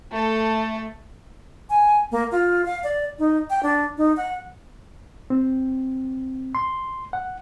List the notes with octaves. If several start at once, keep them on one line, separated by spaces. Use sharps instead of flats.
A3 A4
G#5
A#3
F4
F5
D5
D#4
G5
D4
D#4
F#5
C4
C6
F#5